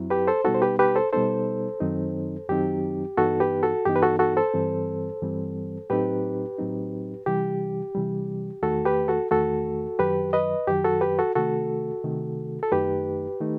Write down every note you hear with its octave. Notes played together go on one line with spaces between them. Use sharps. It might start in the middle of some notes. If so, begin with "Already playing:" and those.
Already playing: F#2 F#3 C4 E4
G4 B4
A4 C5
B2 G3 B3 D#4 F#4 A4
C5
G4 B4
G4 B4
A4 C5
B2 G3 B3 D#4 A4 C5
F#2 D#3 F#3 C4 D#4
F#2 D#3 F#3 C4 D#4 G4
G2 E3 B3 D#4 F#4 A4
G4 B4
F#4 A4
G2 E3 B3 D#4 G4
B4
F#4 A4
F#4 A4
A4 C5
G2 E3 G3 C4
G2 E3 G3 C4
A2 F#3 C4 D#4 G4 B4
A2 F#3 C4 D#4
C3 E3 G3 G4
C3 E3 G3
E2 D#3 A3 F#4 A4
G4 B4
F#4 A4
E2 D#3 A3 F#4 A4
F#2 D#3 F#3 G4 B4
B4 D#5
F#2 D#3 F#3 G4
F#4 A4
G4 B4
F#4 A4
C3 D#3 A3 F#4 A4
C3 D#3 A3
A4
F#2 D#3 A3 D#4 G4 B4
D#3 A3 D#4